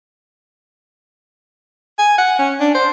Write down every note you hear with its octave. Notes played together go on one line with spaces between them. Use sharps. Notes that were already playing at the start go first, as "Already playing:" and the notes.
G#5
F#5
C#4
D4
C5